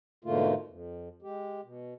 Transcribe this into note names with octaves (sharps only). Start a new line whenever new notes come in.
G#2 B2 D3 A3 A#3 F4
F2
G#3 G4
B2